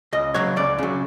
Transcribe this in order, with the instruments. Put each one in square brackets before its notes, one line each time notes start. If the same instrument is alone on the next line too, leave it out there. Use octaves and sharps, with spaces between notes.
[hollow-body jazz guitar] C#2 D#5
C#3 F#3 C#5
C#2 D5
C#3 F#3